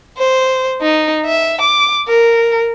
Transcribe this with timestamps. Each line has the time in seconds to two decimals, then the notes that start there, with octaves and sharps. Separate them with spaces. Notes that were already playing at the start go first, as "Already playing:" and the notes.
0.18 C5
0.81 D#4
1.25 E5
1.61 D6
2.08 A#4